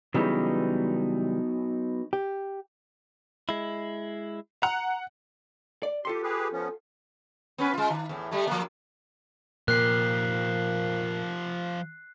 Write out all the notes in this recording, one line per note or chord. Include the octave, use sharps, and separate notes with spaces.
C#3 E3 F#3 G3 B3 D#4
G4
G#3 E4
F#5 A#5
D5
F4 G4 A4 C6
G4 G#4 B4
F3 B3 C#4
B3 C#4 B4
G#3 F4
D#3
E2 A2
G3 A3
F3 A#3
A#2 F3 G4 A#4 F#6 C7